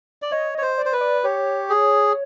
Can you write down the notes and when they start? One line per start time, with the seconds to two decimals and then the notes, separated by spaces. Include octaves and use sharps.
0.22 D5
0.32 C#5 D#5
0.55 C#5 D#5
0.62 C5
0.78 D5
0.86 C5
0.93 B4
1.01 D5
1.24 G4 C#5
1.70 G#4